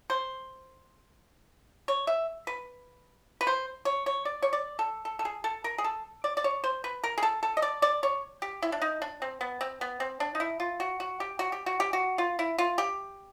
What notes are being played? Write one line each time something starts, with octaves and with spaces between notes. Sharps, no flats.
C5
C#5
E5
B4
B4
C5
C#5
C#5
D5
C#5
D5
A4
A4
A4
G#4
A4
A#4
G#4
A4
D5
D5
C#5
C5
B4
A#4
G#4
A4
A4
D#5
D5
D5
C#5
G4
E4
D4
D#4
D4
C4
B3
C4
B3
C4
D4
D#4
E4
F4
F#4
F#4
G4
F#4
G4
F#4
G4
F#4
F4
E4
F4
G4